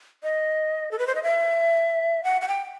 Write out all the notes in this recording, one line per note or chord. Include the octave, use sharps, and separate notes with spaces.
D#5
A4
B4
C5
D#5
E5
F#5
F#5
G5